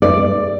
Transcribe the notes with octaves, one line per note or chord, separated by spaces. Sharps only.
D5